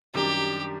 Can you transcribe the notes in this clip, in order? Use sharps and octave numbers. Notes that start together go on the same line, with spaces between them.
F#2 D#3 G3 D4 G4